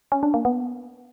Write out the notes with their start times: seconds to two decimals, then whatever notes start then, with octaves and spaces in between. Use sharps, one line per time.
0.12 C#4
0.23 D4
0.34 A#3
0.45 B3